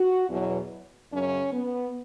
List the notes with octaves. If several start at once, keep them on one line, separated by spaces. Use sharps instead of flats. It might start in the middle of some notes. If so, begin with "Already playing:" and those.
Already playing: F#4
E2 B2 F#3
F#2 C#3 F#3 C#4
B3